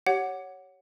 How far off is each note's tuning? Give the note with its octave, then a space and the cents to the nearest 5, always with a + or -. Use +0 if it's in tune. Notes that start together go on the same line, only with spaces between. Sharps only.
G4 -20 C#5 +0 F#5 +0